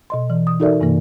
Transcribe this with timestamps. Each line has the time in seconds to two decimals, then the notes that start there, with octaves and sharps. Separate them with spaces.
0.10 B2 D#5 C6
0.30 E3
0.47 D#6
0.60 D#4 F#4 A4 A#4 D5 E5
0.81 G2 C3 E3 A#3